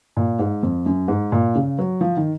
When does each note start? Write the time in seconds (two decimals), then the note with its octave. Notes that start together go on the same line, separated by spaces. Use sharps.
0.17 A#2
0.39 G#2
0.63 F2
0.86 F#2
1.08 G#2
1.32 A#2
1.55 C#3
1.79 F#3
2.01 F3
2.17 D#3